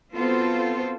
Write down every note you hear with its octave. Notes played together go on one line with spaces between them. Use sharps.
B3 C4 F4 F#4 A4 C5